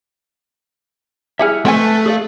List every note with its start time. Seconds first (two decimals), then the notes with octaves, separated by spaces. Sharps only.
1.39 G3 E4 G#4 E5 F#5 F6
1.65 A3 C4 B4 G5 G#5
2.06 G#4 D5 F5